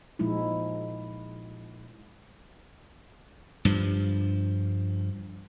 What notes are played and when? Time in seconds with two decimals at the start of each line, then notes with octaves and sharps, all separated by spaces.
0.19 A#2 F3 G#3 D#4 E4
3.65 G2 F3